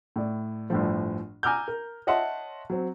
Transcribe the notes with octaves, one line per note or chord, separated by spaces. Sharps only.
A2 D5
G1 A2 F3
G#5 A#5 D6 E6 F6 G6
A#4
C#5 D#5 E5 F#5 A5 C6
F#3 C4